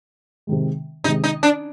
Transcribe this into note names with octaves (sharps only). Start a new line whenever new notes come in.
C3 D#3 G#3
C3 D#3 G#3 D#4
D#4
D4